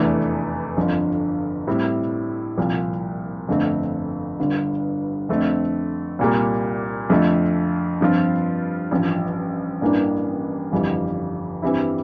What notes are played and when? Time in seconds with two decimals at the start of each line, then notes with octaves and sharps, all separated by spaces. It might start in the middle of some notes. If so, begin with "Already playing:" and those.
Already playing: F1 E2 E3 A3 D4
0.77 G1 F2 D3 F3
1.67 A2 G3 C4 E4
2.58 C2 A#2 F3
3.48 G1 F2 D3 A3 C4
4.39 G1 G2 D3
5.29 F2 D3 A3 C4
6.19 C2 A#2 G3 A#3
7.10 F2 D3 F3 A3
8.01 G2 F3 C4 F4
8.91 A1 G2 F3
9.81 A1 G2 E3 A#3 D4
10.72 G1 F2 E3 G3
11.62 G2 E3 G3 C4 E4